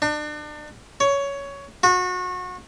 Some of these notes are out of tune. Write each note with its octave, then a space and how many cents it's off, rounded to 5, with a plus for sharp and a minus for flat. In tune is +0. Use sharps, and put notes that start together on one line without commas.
D4 +35
C#5 +15
F#4 -30